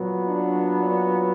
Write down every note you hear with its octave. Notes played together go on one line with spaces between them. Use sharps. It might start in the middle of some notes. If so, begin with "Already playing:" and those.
Already playing: A#2 F#3 B3
D4